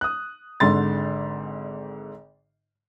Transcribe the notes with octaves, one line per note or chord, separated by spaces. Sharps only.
D#6 F#6
G#1 G#2 D3 C6 A6